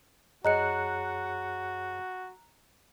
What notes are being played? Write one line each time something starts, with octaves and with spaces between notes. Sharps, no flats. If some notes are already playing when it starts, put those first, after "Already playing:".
F#2 F#4 G#4 C#5 D#5 A#5 F#6 C#7